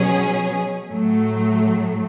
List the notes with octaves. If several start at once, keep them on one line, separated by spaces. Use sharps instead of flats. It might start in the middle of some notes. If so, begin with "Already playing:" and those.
Already playing: B2 F#3 C#4 G#4
A2 F#3 A3